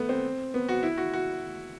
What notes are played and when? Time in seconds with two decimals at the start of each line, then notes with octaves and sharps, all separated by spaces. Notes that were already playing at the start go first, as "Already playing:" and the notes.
Already playing: A3 B3
0.09 C4
0.54 B3
0.69 F#4
0.83 E4
0.98 F#4
1.13 F#4